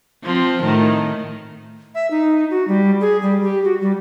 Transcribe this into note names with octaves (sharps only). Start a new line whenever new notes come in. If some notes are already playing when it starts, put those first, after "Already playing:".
F3 C4
A2 D#3
E5
D#4
F#4
G3
G#4
G3
G4
F#4
G3